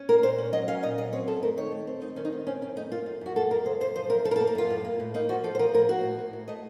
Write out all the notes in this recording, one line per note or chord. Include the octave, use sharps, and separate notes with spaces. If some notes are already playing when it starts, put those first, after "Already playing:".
Already playing: C#4
A#3 A#4
A#2 C5
C#4
F#3 D#5
C#4 F5
A#2 D#5
F#3 D#5
C4 C#5
F#2 A4
A3 A#4
D#3 C#5
A3
C4
F#2 D#4
D#3 C#4
D#4
C4
C4 C#4
F#2 C#4
A3 D#4
A#3 F4
F#2
F#2 F#4
A#3 A4
F#2 A#4
C#3 C5
F#2 C5
F3 C5
F#2 A#4
F3 A4
A#4
A4
A#3
A#4
F#2 F4
A2
A#3
A2
A#3 D#4
F3 F#4
F3 A4
C5
F3 A#4
A2 A#4
A#3 F#4
A2
A2
A2
A3 D#5